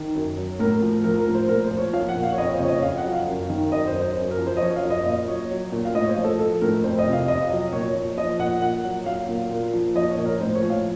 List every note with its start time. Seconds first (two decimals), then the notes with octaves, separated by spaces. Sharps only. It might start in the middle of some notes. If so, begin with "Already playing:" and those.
Already playing: D#3
0.15 F#2
0.37 F#3
0.60 A2 A#4
0.82 F3
1.04 F3 A#4
1.19 A#4
1.27 A2
1.34 C5
1.49 A#2 A#4
1.64 C5
1.71 F3
1.78 C#5
1.93 F3 F5
2.09 F#5
2.16 A#2
2.23 F5
2.32 C#5
2.38 F2 D#5
2.54 C5
2.60 C#3 C#5
2.68 D#5
2.82 F2 F5
2.97 F#5
3.05 F#3
3.13 F5
3.27 F#2
3.50 D#3
3.72 F#2 D#5
3.87 C5
3.94 F#3
4.01 C5
4.16 F#2
4.31 A#4
4.38 F3
4.47 C5
4.57 D#5
4.61 F3 C#5
4.76 F5
4.83 F#2
4.90 D#5
5.05 A#2 D#5
5.28 F#3 C#5
5.51 F#3
5.72 A#2
5.85 F5
5.95 A2 D#5
6.05 C#5
6.09 C5
6.17 F3
6.24 A4
6.39 F3 A4
6.61 A2 A#4
6.83 F2 C5
6.99 D#5
7.06 C3
7.13 F5
7.28 F2 D#5
7.51 F#3
7.73 A#2 C#5
7.95 F3 C#5
8.18 F3 D#5
8.39 A#2 F#5
8.62 A#2 F#5
8.85 F#3
9.06 F#3 F5
9.29 A#2
9.51 A#2
9.74 F3
9.95 F3 D#5
10.11 C#5
10.18 A#2
10.26 A#4
10.40 A2 C5
10.55 C#5
10.63 F3
10.70 F5